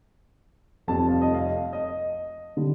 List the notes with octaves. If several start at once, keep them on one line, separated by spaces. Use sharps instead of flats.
F1 F2 C3 G3 A5
F5
D#5
F5
D#5
D3 G3